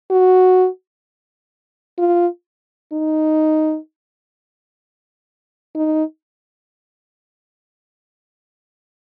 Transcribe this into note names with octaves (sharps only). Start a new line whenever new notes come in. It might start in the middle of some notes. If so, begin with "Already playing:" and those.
F#4
F4
D#4
D#4